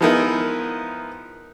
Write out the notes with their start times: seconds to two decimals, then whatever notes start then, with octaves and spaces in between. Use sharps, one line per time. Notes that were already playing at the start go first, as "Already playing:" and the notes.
0.01 F3 G#3 B3 D#4 E4 A#4